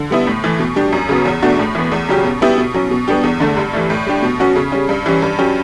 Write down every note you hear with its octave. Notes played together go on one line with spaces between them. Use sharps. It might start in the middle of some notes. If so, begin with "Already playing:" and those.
Already playing: D3
G3 B3 E4
A2
E3 A3
B2
G3 D4 G4
F#2
C#3 F#3 B3
E2
B2 A3 D4 F#4
A2
E3 B3
E2
C#3 F#3 C#4 G4
B2
G3 B3 E4 G4
B2
F#3 C#4
B2
G3 B3 D4 G4
E2
D3 A3
G2
E3 A3
A2
G3 D4 G4
B2
F#3 C#4 F#4
C#3
G3 C#4
G2
E3 G3 C#4
G2
F#3 C#4 G4